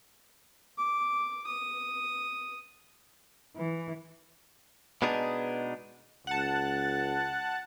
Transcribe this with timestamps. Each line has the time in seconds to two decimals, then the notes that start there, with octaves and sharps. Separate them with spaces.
0.78 D6
1.46 D#6
3.56 E3
5.02 B2 G#3 B3 D4 D#4 G#4
6.27 C#2 F#5 A5